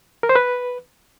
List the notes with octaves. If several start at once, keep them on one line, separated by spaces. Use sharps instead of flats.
A#4
C5
B4